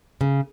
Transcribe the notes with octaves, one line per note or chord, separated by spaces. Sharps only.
C#3